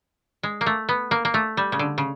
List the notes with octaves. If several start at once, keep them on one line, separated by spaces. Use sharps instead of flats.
G#3
A#3
A3
B3
A#3
A#3
A3
G3
C#3
D3
C#3